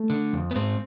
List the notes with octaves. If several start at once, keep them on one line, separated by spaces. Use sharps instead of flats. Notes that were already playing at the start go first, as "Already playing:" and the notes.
Already playing: A3
D3
F2
B3
G#2 C4